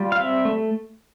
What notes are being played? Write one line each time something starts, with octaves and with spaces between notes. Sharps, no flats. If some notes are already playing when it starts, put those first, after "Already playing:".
Already playing: G3 F4
F5
C4 E5
A3